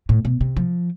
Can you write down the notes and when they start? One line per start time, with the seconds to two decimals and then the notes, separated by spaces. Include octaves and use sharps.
0.09 A2
0.25 B2
0.41 C3
0.57 F3